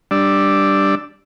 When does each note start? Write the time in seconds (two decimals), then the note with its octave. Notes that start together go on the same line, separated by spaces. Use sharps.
0.11 G3 D4 D5 E6